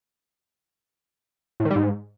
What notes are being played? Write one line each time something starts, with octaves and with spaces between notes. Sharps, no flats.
A2
D#3
G3
G#2